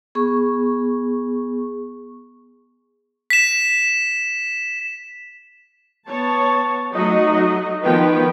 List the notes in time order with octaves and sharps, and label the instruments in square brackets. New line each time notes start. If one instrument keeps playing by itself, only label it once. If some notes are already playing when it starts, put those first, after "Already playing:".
[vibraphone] B3 G#4 C#6
[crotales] B6 E7
[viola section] B3 C#5 A5
F#3 A3 D#4 F#4 D#5
D#3 F3 B3 B4 G5